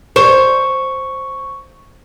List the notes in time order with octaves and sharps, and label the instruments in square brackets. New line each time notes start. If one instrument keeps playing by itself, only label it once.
[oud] C5 [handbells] C#6